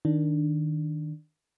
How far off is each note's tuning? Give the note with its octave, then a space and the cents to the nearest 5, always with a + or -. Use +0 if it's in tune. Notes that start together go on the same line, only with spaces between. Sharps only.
D#3 +0 D4 +0